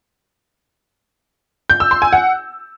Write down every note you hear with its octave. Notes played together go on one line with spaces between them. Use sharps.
G6
E6
C6
G#5
F#5